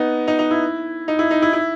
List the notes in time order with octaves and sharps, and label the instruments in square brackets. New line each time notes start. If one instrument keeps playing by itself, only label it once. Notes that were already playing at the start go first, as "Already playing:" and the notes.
Already playing: [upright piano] B3 D#4
D#4
D#4
E4
D#4
E4
D#4
E4
E4